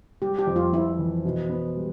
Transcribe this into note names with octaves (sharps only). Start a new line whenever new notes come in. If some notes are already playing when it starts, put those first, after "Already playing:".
G3 G4
G4
F2
F4
F2 E4
E3
B2
B3
G3